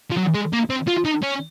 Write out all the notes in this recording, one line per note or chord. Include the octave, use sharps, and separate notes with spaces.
F3
F#3
G#3
A#3
C4
F4
D#4
C#4